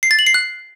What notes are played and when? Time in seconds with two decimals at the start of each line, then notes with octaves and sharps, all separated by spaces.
0.03 C7
0.11 A6
0.19 F#7
0.27 C7
0.34 F#6